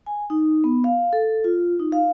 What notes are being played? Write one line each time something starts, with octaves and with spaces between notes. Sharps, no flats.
G#5
D#4
B3
F5
A4
F4
D#4
F5